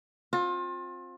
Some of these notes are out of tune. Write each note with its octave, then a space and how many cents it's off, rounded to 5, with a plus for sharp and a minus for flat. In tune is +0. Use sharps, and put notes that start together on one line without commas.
C4 +15 F4 +30